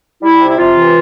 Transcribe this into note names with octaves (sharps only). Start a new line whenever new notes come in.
G3 E4
C3
E4
C3 F4
E3